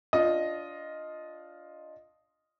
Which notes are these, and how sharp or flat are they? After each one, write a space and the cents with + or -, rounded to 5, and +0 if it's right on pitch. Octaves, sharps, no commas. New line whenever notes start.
D4 -15 F4 +0 D#5 +0